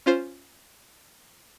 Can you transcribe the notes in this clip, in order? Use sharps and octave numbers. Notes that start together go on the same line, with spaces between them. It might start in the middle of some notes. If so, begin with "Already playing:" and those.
C#4 F4 C5